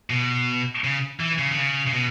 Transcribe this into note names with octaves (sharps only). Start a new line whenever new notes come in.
B2
C#3
E3
C#3
D3
C#3
C#3
B2